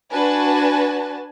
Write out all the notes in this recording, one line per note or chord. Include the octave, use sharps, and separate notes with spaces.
D4 F#4 B4 G#5 A5